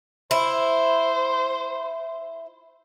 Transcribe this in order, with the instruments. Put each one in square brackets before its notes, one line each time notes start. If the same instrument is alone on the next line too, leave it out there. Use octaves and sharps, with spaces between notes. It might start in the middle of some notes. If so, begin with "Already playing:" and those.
[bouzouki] E4 [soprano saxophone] C5